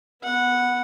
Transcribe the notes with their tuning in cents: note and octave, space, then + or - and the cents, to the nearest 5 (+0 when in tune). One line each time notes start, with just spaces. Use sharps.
B3 +0 F#5 -10